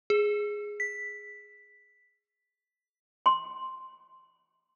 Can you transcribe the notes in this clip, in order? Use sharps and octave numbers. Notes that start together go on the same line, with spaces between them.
G#4
B6
C6